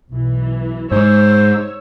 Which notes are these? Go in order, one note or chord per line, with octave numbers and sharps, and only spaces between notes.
B1 E3
G#2 G#3 C5 C#5 E6